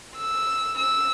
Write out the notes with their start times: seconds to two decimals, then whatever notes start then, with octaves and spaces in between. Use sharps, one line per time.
0.17 E6
0.78 E6